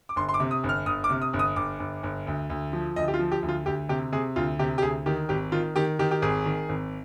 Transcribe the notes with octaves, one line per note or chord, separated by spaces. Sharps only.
D6
G1 C6
C6
D6
C3
D#6
G1
F6
G1 D#6
D6
C3
D#6
G1
D#6
G1 D6
G1
G1
D2
D2
F3
D2 D#5
G4
F4
F3
G4
D2
F4
D2 G4
C3 G4
C3 G#4
D2 F4
C3 G4
G4
D2 G#4
D#3 G4
G#1 G4
D#3 F4
D#3 G4
D#3 G4
G4
G#1 G#4
D#3
G#1